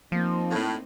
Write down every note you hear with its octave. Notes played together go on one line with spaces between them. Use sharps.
F3 A#3 C4 D#4
A2